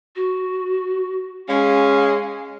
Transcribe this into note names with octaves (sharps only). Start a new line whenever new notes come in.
F#4
G#3 C#4 F5